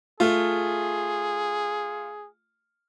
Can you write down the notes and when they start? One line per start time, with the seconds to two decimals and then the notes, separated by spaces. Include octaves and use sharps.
0.20 A3 F4 G#4